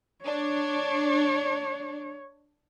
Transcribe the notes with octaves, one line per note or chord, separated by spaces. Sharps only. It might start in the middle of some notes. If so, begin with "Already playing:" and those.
D4 C#5